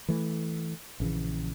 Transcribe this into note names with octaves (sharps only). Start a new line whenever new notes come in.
E3 A3
A#1 C#3 E3